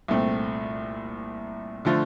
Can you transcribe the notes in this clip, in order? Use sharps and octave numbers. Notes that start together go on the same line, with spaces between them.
C2 A#2 A3 C4
D3 F3 A3